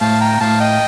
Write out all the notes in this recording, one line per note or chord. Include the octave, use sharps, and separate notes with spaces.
A2 F5 A5
G5 A#5
A2 F5 A5
D#5 G5